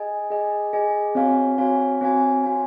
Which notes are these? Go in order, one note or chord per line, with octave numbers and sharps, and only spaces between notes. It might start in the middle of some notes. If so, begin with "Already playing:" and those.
Already playing: G#4 D#5 G#5
G#4 D#5 G#5
G#4 D#5 G#5
C4 F#4 C#5 F5 G#5
C4 F#4 C#5 F5 G#5
C4 F#4 C#5 F5 G#5
C4 F#4 C#5 F5 G#5